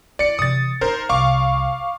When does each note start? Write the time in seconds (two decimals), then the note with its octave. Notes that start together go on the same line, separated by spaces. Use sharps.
0.19 E4 D5 C#7
0.39 C3 E3 D#6 A6
0.81 D#4 A#4 C5
1.09 C2 F5 C#6 D6